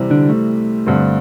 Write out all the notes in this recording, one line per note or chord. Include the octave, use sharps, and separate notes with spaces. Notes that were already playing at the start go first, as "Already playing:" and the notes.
Already playing: C3 E3 G3 C4
D3 D4
A3
G2 D3 C4